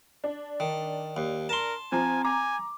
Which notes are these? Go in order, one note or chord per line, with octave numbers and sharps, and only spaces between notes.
D4
D#3
D#2
A#4 A5 C6
F3 C4 G#5 A#5
G#5 A#5 D6